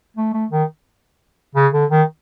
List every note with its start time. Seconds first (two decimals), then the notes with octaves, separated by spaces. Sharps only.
0.17 A3
0.34 A3
0.51 D#3
1.55 C#3
1.73 D3
1.91 D#3